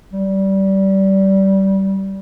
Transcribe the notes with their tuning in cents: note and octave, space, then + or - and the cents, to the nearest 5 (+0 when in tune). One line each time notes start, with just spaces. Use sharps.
G3 -20